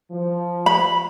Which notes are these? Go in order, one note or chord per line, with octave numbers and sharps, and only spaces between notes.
F3
B5